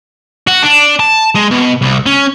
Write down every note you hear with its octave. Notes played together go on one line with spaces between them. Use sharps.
F#4
D4
A5
G#3
B2
C2
C#4